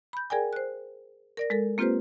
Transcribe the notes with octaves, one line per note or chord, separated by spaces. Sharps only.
B5 G6
G#4 A#4 D5 G5 G#5
C5 F#6
A#4 D5 A#6
G#3 A4 A#4
A#3 C4 F4 G4 B4 C5